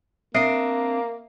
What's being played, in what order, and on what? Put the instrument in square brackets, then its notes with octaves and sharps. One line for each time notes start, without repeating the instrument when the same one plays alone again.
[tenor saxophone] A#3 [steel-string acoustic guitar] C4 D4 [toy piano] C5 E5 [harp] D#6 C7 D7